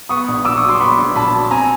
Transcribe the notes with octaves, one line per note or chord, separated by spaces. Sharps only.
B3 C#6 D#6
A#1
A#2 D6 E6
C#6 D#6
F#3
C6 D6
B3 B5 C#6
A#1
A#2 A5 B5
F#3
C4 G#5 A#5